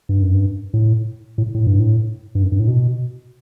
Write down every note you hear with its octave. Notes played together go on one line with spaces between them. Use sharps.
G2
F#2
G2
A2
A2
A2
G2
A2
G2
F#2
G2
A2
B2